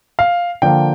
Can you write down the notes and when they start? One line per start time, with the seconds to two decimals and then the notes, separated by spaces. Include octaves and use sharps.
0.19 F5
0.62 D3 F3 A#3 G5